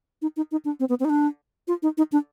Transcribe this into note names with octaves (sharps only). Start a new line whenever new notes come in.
D#4
D#4
D#4
D4
C4
B3
C4
D#4
D4
F4
D#4
D#4
D4